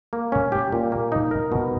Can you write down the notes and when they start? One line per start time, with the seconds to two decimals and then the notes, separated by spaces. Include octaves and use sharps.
0.13 A#3
0.32 C#4
0.52 G4
0.72 A#2
0.92 A#3
1.12 D#4
1.31 A#4
1.52 B2